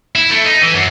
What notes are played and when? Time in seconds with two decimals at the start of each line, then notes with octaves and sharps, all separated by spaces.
0.16 E4
0.31 A3
0.45 D#4
0.62 E3
0.74 F#2